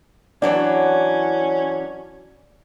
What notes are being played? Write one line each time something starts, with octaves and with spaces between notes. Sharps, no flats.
E3 F#3 C#4 D4 D5